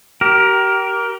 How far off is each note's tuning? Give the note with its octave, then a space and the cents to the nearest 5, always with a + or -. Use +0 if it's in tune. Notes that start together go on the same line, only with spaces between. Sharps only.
G4 -30 A#4 +10